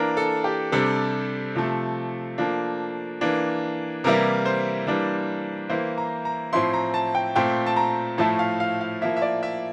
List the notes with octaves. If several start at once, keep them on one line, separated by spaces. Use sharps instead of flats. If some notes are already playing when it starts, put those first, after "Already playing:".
Already playing: E3 A#3 D4 A#4
A4
G4
C3 G3 D4 A4
C3 F3 A3
F3 A#3 D4
E3 A#3 D4
C3 E3 G3 A#3 E4 A#4
C5
E3 G3 A#3 D4
E3 A#3 E4 C5
A#5
A#5
A2 F3 C4 E4 C6
A#5
A5
G5
A#2 A3 C4 G5
A5
A#5
A2 F3 A3 E4 A5
F5
F5
F5
F3 A#3 E4 E5
E5
D5
E5